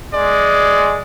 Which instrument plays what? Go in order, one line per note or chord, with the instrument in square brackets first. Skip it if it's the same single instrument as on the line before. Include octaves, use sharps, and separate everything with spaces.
[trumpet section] G#3 [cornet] D5